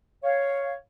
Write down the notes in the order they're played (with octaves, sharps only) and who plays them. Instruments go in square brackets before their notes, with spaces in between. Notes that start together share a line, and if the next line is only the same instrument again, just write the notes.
[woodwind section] C#5 F5